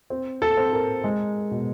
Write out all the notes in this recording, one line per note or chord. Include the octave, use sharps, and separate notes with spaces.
C4
A4
C4
A#4
G#3
B2